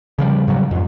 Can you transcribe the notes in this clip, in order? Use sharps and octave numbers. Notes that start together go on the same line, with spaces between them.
C#3 F3 G3
G#2 C#3 F#3 G3
F2 G#2